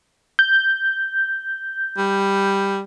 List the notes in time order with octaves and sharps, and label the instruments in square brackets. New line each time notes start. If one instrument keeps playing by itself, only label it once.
[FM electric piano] G6
[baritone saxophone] G3